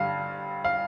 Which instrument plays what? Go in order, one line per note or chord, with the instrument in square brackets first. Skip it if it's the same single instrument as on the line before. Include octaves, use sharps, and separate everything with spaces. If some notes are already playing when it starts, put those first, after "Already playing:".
Already playing: [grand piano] G2 D3 G3 F5
F5